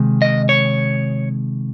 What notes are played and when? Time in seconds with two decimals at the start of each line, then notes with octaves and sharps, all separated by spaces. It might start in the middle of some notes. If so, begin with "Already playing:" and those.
Already playing: C3 D#3 G#3
0.22 D#5
0.49 C#5